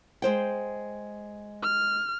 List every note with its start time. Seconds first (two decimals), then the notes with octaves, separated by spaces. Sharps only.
0.22 G#3 C5 G5
1.62 F6